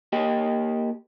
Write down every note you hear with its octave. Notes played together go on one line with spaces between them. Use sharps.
A#3 G4 D#5